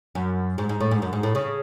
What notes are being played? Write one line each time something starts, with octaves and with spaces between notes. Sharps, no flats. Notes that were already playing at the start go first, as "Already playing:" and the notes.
F#2
G#2
G#2
A2
G#2
F#2
G#2
A2
C#3